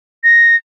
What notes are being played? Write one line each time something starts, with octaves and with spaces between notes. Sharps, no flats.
A#6